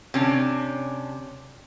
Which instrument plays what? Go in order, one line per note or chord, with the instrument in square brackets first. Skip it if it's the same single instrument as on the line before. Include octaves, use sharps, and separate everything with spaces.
[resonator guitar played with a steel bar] C3 C#4 D4